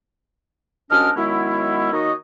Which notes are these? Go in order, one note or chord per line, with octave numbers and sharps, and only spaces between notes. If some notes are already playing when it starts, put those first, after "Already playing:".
C2 F#3 C#4 D4 D#5 F6
D#3 F#3 G#3 B3 C#4 E4
D#3 A#3 D#4 F#4 C#5 D#5